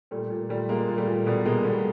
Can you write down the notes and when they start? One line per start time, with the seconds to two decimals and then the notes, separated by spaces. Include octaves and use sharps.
0.11 A#2 G3 A3
0.30 A#2
0.49 A#2 G3 A3
0.69 A#2 G#3 A#3
0.88 A#2
0.97 G3 A3
1.07 A#2
1.26 B2 G3 A3
1.45 B2 G#3 A#3
1.64 B2 G3 A3